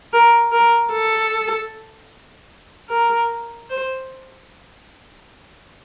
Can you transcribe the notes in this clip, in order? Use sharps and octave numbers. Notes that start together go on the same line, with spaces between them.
A#4
A#4
A4
A#4
C5